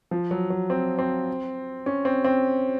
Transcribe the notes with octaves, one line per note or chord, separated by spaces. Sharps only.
F3
F#3
F#3
C4
C4
C#4
C4
C4